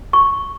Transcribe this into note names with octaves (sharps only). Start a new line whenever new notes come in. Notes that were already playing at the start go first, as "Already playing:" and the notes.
C#6